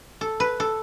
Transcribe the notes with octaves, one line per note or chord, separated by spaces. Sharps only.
A4
B4
A4